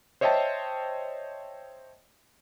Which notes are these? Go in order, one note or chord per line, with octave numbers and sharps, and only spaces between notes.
C5 C#5 D#5 E5 G5 A5